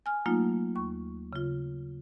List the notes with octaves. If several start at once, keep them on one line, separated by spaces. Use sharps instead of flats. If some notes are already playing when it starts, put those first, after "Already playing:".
G#5 F6
F#3 A3 A#3 D#4 F4
D#2 C#6
C#3 F4